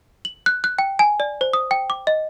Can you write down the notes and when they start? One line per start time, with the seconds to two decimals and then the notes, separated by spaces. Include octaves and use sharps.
0.25 F#7
0.46 F#6
0.64 F#6
0.79 G5
0.99 G#5
1.20 D5
1.41 C5
1.53 D#6
1.71 G5
1.90 D6
2.07 D#5